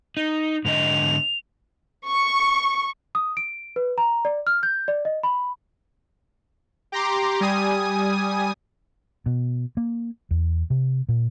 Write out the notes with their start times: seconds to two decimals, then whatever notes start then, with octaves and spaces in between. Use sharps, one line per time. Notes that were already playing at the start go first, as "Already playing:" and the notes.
0.17 D#4
0.65 G#2 D3 D#5 F7
2.07 C#6
3.15 D#6
3.37 D7
3.76 B4
3.98 A#5
4.25 D5
4.47 F6
4.63 G6
4.88 D5
5.05 D#5
5.23 B5
6.92 G4 A#5 C6 D6
7.41 G3 G#5 D#6 D#7
9.26 B2
9.77 A#3
10.31 E2
10.70 C3
11.09 A#2